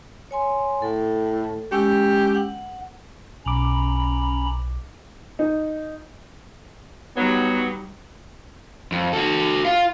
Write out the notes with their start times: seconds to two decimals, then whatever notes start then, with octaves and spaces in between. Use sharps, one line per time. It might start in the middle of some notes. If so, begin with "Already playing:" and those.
0.31 C#5 G#5 C6
0.82 A2 A4
1.72 G#3 C#4 G4 E6
2.35 F#5
3.46 B1 C#4 A#5 B5 D6
5.39 D#4
7.17 F#3 G3 B3 D#4
8.92 F2
9.13 F#4 A4
9.65 F4 F5